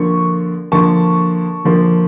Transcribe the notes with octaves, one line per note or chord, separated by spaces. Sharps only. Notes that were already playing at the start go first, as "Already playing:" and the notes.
Already playing: D3 F3 A#3 C#6
D3 F3 A#3 A5 C#6
D3 F3 A#3